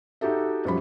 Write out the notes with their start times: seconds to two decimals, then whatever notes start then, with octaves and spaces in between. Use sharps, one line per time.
0.21 D#4 F#4 G4 A4 E5
0.65 F#2 F3 G3 B5